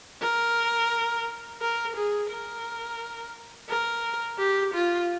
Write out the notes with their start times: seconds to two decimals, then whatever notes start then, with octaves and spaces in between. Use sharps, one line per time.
0.22 A#4
1.61 A#4
1.96 G#4
2.30 A#4
3.69 A#4
4.38 G4
4.74 F4